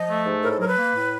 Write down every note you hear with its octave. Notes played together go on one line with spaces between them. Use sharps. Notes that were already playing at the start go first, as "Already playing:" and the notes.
Already playing: F3 D#5
A3
G#2
A2 A#4
A4
F#3 A#4
B4
A#3
A2